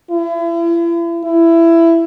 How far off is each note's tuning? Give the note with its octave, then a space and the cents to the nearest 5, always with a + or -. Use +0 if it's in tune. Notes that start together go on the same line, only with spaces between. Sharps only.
E4 +40
E4 +15